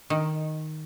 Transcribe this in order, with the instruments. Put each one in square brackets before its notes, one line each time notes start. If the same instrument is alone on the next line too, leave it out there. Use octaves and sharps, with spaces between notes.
[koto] D#3